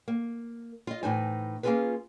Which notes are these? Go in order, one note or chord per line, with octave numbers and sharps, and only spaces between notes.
A#3
F4 D#5
A2 E3 D#4 C5 G#5
A#3 C#4 D#4 F4 G#4 B4